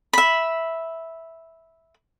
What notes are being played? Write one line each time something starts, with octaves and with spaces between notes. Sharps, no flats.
E5 B5